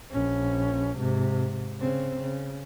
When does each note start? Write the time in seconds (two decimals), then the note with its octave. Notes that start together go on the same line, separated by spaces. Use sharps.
0.12 A#1 C#4
0.99 G#2 C3
1.80 C#3 C4
2.21 C#3